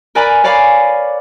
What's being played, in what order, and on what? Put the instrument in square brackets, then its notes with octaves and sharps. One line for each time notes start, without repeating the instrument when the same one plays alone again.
[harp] A#4 B4 D5 G#5 A#5 B5
C#5 D5 F5 G#5 B5 D6